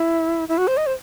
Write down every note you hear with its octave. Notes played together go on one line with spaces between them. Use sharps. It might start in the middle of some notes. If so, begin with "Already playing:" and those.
Already playing: E4
E4
F#4
C5
D#5
C5